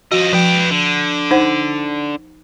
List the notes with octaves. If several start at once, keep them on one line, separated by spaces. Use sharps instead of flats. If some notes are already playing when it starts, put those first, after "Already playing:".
F3 F#4 D#5
F3 B4 G5
D3
D#4 C5 F#5